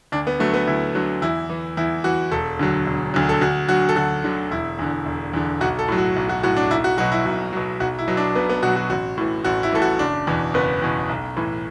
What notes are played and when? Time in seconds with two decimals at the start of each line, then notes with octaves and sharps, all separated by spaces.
0.12 D2 D4
0.27 B3
0.40 D3 F#3 A3
0.54 B3
0.67 D2 E4
0.95 D3 F#3
1.22 E2 E4
1.50 E3
1.77 E2 E4
2.04 E3 F#4
2.32 E1 A4
2.59 D2 D3 F#3
2.87 E1
3.14 D2 D3 F#3
3.29 A4
3.41 D2 F#4
3.68 D3 F#3 F#4
3.89 A4
3.96 D2 F#4
4.24 D3 F#3
4.51 E1 E4
4.79 E2 D3
5.06 E1
5.33 E2 D3
5.61 B1 F#4
5.79 A4
5.88 A2 F#3
5.98 F#4
6.16 B1
6.29 F#4
6.43 A2 F#3 F#4
6.57 D4
6.71 B1 E4
6.84 F#4
6.98 B2 F#3 F#4
7.12 E4
7.25 B1 F#4
7.53 B2 F#3
7.80 B1 F#4
7.99 E4
8.08 B2 F#3
8.17 D4
8.35 B1 B3
8.50 B3
8.63 B2 F#4
8.66 F#3
8.76 F#4
8.90 A1 F#4
9.18 A2 E3
9.44 A1 F#4
9.63 E4
9.73 A2 E3 A4
9.82 F#4
9.99 F#1 D4
10.27 E2 B2
10.54 F#1 B3
10.82 E2 B2
11.09 B1
11.37 A2 E3